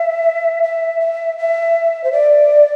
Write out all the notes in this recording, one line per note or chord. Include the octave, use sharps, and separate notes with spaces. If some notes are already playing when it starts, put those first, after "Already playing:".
Already playing: E5
E5
E5
E5
C5
D5